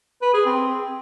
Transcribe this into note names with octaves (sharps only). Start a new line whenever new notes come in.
B4
G#4
C4